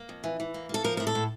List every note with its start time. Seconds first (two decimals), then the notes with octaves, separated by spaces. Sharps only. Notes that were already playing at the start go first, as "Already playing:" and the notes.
Already playing: A#3
0.09 F2
0.24 E3
0.40 E3
0.54 A#3
0.69 A#3 A4
0.84 F3 A#4
0.97 A2 A#4
1.07 A4
1.15 A2